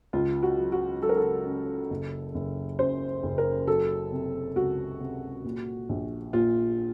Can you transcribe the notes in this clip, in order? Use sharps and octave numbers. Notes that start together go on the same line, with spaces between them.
C#2 F4
F#4
F#3
F#4
F#3 A4
A#4
A4
C#3
F#1
F#1
F#2 C5
F#1
A#4
F#3 A4
C3
C#2 F#4
C3
A#2
A#1
A#2 F4